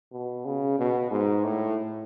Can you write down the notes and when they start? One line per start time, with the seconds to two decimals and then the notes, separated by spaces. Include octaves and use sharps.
0.12 B2
0.45 C#3
0.79 B2
1.11 G#2
1.44 A2